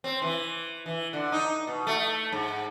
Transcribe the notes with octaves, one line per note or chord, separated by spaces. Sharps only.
C4
E3
E3
D3
D#4
B2
A3
G#2